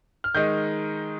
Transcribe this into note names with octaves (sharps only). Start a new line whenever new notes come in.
F6
D#3 G#3 D#4 G6